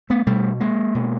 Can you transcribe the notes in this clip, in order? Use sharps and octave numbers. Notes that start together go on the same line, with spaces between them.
A3 B3
B2 G3 A3
G#3 A#3
B2